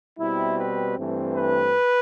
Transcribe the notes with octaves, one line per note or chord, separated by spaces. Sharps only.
B2 G3 C4 E4
B4
G2 E3 A3 C4
B4